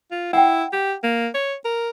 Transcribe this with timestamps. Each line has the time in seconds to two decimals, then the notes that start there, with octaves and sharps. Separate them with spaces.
0.11 F4
0.33 E4 F#5 G5
0.72 G4
1.03 A#3
1.34 C#5
1.65 A#4